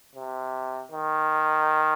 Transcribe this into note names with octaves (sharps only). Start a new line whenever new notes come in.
C3
D#3